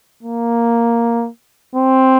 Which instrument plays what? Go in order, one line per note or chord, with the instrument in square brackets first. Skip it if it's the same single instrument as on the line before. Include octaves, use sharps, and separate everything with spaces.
[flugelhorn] A#3
C4